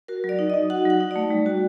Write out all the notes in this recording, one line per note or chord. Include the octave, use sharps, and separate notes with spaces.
F#4 A#4
F#3
D5
D#4
D#4 D#5
F#4 F#5
F#3 F#5
D#4
A3 D5
G3
F#4